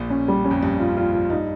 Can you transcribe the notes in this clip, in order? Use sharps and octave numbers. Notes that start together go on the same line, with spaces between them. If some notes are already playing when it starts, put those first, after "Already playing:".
Already playing: A#1 A#2
C#4
G3
C#4
F2
G2 C#4
F4
F4
F4
G2 D#4